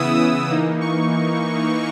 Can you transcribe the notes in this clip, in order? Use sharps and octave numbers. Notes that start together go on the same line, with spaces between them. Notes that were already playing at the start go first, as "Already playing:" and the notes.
Already playing: C#3 E3 B3 E4 D#6 E6
E3 A#3 D#4
C#6